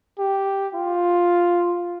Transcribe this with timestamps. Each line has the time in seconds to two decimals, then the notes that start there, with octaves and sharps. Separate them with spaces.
0.19 G4
0.75 F4